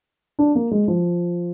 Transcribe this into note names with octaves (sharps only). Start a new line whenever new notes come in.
D4
A#3
G#3
F3